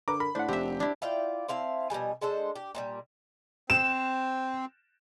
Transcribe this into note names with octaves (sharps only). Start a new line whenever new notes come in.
D3 A#4 B4 D6
A#4 B5
A2 D4 C5 F#5
F1 C4 G4 E5
D4 E4
E4 F4 D5 G5
C4 E4 F5 A5
B2 F3 G3 G#5
G#3 D4 A4 C5
G4
A#2 D#3 G3
C4 E7